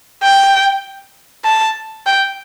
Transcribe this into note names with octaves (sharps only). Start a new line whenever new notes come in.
G5
A5
G5